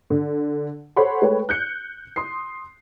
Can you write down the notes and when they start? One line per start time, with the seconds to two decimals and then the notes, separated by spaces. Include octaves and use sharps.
0.10 D3
0.96 A4 C5 C#5 F#5 B5 C6
1.22 G#3 A3 B4 C#5 G5
1.49 F#6 G6 C#7
2.16 C6 D#6 C7